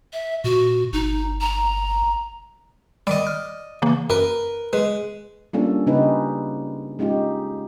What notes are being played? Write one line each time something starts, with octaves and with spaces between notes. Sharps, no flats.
E5
A#2 F#4
G1 D#4
A#5
D#3 G3 D5 D#5
F6
C#3 E3 A#3
F#2 A#4 B4
G#3 B4
G3 A#3 C#4 D4 F4 A4
C#3 A#3 C#4 D#4 G4 B4
G#3 C#4 D#4 F4 G4